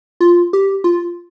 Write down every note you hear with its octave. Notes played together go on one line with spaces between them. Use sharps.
F4
G4
F4